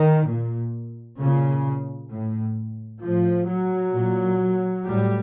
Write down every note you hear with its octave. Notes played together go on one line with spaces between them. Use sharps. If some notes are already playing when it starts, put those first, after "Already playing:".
Already playing: D#3
A#2
A#2 C#3
A2
A2 F3
F#3
A#2
A2 G3